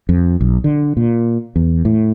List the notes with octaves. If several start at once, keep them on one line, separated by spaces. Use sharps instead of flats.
F2
B1
D3
A#2
E2
A2